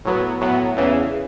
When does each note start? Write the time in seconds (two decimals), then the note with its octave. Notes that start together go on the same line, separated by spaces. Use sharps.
0.05 A2 F#3 B3
0.41 A2 F#3 B3
0.77 E2 C#3 E3